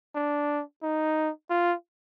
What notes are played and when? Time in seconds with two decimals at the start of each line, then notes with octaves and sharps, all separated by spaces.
0.15 D4
0.83 D#4
1.50 F4